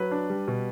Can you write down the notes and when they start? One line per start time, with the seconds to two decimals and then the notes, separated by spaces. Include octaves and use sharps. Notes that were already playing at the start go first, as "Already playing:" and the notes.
Already playing: F#3 B4
0.11 D4
0.30 G3
0.48 B2